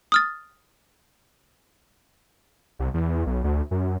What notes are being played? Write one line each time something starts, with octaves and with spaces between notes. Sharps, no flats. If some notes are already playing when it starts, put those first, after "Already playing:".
D#6 F6 A6
C2
E2
B1
D2
F#2